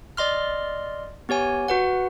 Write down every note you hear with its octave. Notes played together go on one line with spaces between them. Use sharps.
D5 D#5 C6 F6
B3 G4 C#5 G#5
F#4 B4 F#5